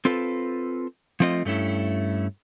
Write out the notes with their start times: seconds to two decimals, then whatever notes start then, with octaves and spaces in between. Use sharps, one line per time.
0.05 C4 F4 A4 B4
1.20 F3 A3 C4 F4 D#5
1.45 G2 A3 C#4 E4